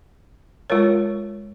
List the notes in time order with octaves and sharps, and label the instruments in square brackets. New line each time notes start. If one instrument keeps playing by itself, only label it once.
[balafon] G#3 F4 A#4 C#5